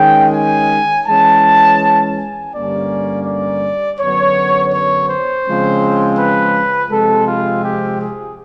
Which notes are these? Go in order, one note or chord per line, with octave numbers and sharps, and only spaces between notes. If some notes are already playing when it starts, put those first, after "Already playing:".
Already playing: D#3 G#3 C#4 G5
G#5
E3 G#3 C#4 A5
G#5
G2 D3 G3 A#3 C#4 D5
D5
F#2 D3 F#3 B3 C#5
C#5
C5
C#3 F3 G#3 C4
B4
C3 F3 G#3 C4 A4
F4
G4
G#4